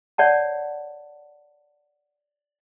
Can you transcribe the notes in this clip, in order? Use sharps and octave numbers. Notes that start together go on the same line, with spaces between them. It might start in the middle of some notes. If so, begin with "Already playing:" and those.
C#5 D5 F#5 A5